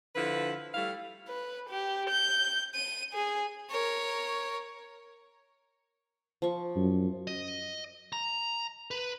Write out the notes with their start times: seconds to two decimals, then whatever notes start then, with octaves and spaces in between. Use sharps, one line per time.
0.16 D3 F3 E4 B4
0.74 G3 A3 E4 F5
1.28 B4
1.69 G4
2.09 G6
2.74 D#7
3.14 G#4
3.70 A#4 C#5
6.42 F3 C#6
6.76 F#2
7.27 D#5
8.13 A#5
8.91 B4